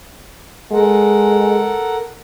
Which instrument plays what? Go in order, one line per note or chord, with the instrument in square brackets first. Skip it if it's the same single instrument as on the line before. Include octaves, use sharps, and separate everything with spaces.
[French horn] G#3 [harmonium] A4 A#4 F#5